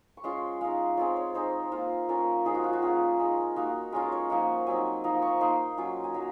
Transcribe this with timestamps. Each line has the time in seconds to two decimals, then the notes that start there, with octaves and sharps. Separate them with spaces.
0.17 C#6
0.24 G#3 C#4 F4 C6
0.61 G#3 D#4 F5
0.97 G#3 C4 F4 C#5
1.16 C#5
1.35 G#3 D#4 C5
1.72 A#3 F4
2.09 A#3 C#4 F4 A#4
2.45 F3 G#3 D#4 G#4
2.55 F#4
2.64 F4
2.73 F#4
2.82 A#3 C#4 F4 G#4
3.20 G#3 D#4
3.56 A#3 D#4 F#4
3.92 G#3 C#4 F4 A#4
4.12 C#5
4.30 F3 A#3 D#4 F#5
4.67 F#3 C4 D#4 G#5
5.04 F3 A#3 D#4 A#5
5.22 C#6
5.41 A#3 D#4 C6
5.77 F#3 C#4 F4
6.04 G#5
6.14 F#3 A#3 A#5